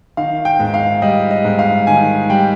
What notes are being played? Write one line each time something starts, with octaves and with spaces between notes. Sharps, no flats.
D#3 F5
G5
G#2
F5
G3 D#5
D#5
G#2
F5
D#3 G#5
G3 G5